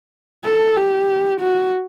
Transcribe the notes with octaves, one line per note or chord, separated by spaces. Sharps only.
A4
G4
F#4